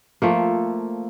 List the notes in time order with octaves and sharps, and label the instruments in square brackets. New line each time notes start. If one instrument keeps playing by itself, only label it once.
[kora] F3 A3 A#3